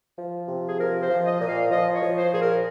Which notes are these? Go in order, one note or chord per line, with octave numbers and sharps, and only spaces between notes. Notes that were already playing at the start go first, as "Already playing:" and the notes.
F3
C3
G#4
F3 A#4
C5
F3
D#5
A#2
F5
F3 D#5
C#5
F3
C5
A#2 G#4
A#4